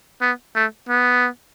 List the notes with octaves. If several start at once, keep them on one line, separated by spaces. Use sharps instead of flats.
B3
A3
B3